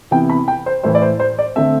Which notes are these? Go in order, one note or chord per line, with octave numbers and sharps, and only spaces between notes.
C3 E3 B3 E4 G5
B5
G5
C5
A2 E3 A3 E4 C5
D5
C5
C5
D5
D3 A3 C4 E5